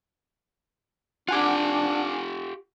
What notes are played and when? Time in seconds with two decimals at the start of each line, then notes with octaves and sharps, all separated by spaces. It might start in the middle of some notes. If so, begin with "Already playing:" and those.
1.28 D4 F4 G4 F#5 G#5 D6